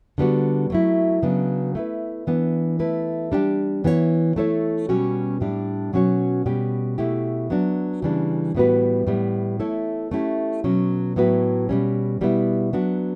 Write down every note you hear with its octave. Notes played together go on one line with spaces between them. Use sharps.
D3 G3 B3 F#4
F#3 A3 E4
C#3 F#3 B3 D4
A3 E4 B4
E3 B3 D4
A3 E4 B4
G3 D4 G4
E3 B3 F#4 C#5
A3 E4 A4 C#5
B2 G3 C#4 F#4
A2 G3 D4
B2 F#3 C#4 F#4 C#5
B2 G3 C#4 G4
B2 A3 E4 G4
F#3 B3 D4 F#4
C#3 E3 G3 D4
A2 G3 B3 F#4 B4
A2 G3 B3
A3 E4 A4 C#5
A3 C#4 E4 G4
B2 F#3 C#4
A2 F#3 B3 F#4 B4
B2 G3 C#4
B2 G3 B3 E4
F#3 B3 D4 F#4